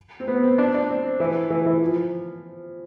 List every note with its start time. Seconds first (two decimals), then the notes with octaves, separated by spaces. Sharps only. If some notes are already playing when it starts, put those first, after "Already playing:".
0.20 C4
0.28 B3
0.43 C4
0.58 D4
0.74 D4
0.89 C4
1.20 E3
1.50 E3
1.66 E3
1.81 F3